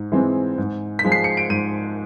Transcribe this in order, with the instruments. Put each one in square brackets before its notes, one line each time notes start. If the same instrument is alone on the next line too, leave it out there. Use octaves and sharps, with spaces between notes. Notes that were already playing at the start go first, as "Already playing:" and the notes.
Already playing: [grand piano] G#2
E3 G#3 C4
G#2
B6
F3 G#3
C7
C#7
D7
G#2 D#7